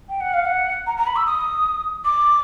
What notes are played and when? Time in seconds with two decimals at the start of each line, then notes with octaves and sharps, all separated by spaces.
0.09 G5
0.20 F#5
0.33 F5
0.45 F#5
0.86 A#5
0.97 A#5
1.06 B5
1.15 E6
1.26 D#6
2.04 D6